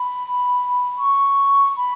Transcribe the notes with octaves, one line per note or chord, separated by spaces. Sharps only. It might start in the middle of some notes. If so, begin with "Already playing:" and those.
Already playing: B5
C#6
B5